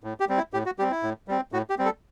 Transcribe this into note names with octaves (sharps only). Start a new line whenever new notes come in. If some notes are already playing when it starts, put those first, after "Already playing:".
A2
G4
G3 C4
E4
A2 G4
F#4
G3 C4 G4
E4
A2
G3 C4
A2 F#4
G4
G3 C4
A4